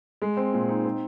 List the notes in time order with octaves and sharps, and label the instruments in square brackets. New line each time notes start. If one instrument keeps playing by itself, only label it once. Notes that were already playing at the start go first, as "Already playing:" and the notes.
[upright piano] G#3
C4
A#2
D#4
C4